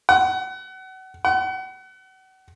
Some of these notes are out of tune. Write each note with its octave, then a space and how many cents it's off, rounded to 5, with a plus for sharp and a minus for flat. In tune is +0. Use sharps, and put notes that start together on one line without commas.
F#5 +30
F#5 +35